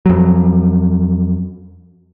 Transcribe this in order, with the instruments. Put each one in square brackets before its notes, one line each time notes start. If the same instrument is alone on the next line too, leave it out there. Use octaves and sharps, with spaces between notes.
[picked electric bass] F2 F#3